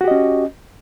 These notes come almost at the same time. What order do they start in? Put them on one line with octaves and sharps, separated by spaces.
F#4 G4 D#5 C#4